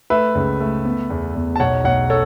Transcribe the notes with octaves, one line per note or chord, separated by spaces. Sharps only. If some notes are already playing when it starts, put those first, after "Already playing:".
A3 B4 E5
C#2
A3
B3
E2
E2
A5
B1 C#5 F#5
B1 C#5 F#5
A4 C#5